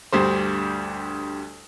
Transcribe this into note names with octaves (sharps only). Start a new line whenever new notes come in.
D2 G2 G3 C5